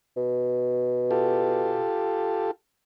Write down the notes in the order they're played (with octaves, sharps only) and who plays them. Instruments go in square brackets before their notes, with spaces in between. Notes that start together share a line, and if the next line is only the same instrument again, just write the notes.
[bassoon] B2
[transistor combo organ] F4 G4 A4